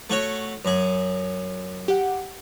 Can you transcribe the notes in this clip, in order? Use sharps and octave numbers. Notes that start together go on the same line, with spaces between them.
A3 F#4 C#5
F#2 G#4
G4 F#5